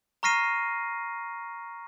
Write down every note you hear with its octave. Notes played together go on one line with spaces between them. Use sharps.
A#5 C#6 F6 A#6 C7 D#7